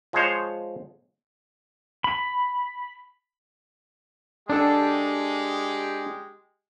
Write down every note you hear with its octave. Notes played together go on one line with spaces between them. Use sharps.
F3 G#3 G#4 C5 C#5
B5
G#3 D4 G4 A4